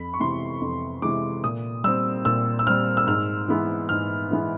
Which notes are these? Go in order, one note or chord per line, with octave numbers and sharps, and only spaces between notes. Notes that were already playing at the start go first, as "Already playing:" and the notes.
Already playing: F2 B5
C#6
C3 E3 G#3 B3 C6
F2
C3 E3 G#3 B3 D6
A#2 D#6
G3 C4 E6
A#2 E6
E6
G3 C4 F6
E6
G#2 F6
E3 G#3 B3
G#2 F6
E3 G#3 B3